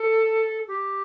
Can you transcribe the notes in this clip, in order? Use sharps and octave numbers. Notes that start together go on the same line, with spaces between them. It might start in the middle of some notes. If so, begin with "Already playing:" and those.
Already playing: A4
G4